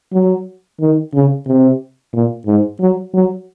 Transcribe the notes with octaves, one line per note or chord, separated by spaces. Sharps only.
F#3
D#3
C#3
C3
A#2
G#2
F#3
F#3